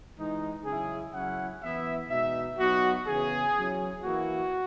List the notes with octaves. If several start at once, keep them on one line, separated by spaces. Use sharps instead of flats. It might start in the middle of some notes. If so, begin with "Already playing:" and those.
E3 G#3 D#4
C#3 F#3 C#4 E4 G#4
C#3 F#3 C#4 E4 F#5
E3 B3 E4 E5
B2 G#3 D#4 E5
F#3 B3 D#4 F#4
C#3 E3 B3 G#4
F#3 C#4 E4
E3 A#3 E4 F#4